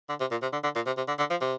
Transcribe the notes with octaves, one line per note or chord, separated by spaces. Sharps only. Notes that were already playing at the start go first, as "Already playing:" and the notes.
D3
C3
A#2
C3
D3
D3
A#2
C3
C3
D3
D3
F3
C3